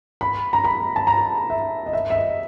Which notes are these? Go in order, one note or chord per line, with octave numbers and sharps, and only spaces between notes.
B5
A#5
B5
A5
A#5
E5
D#5
E5
E5
D#5